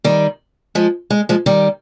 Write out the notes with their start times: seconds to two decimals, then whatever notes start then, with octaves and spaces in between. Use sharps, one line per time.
0.04 D#3 G3
0.75 F3 G#3
1.10 G#3
1.29 F3 G#3
1.46 D#3 G3